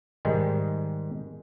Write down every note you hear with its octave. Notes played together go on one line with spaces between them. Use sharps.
G#2 D#3 G3 G#3